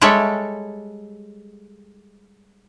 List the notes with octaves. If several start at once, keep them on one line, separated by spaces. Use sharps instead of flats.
G3 G#3 A4 C#5 E5